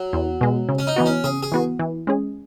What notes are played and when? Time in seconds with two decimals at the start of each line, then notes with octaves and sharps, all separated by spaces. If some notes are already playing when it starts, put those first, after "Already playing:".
Already playing: F#3
0.13 E2
0.41 B2 G#3
0.69 C#3
0.79 C#4
0.87 D#4
0.96 E3 B3 F#4
1.06 C#4
1.24 C#3 G#4
1.43 G#4
1.52 E3 B3 F#4
1.79 E3
2.07 G#3 C#4 G#4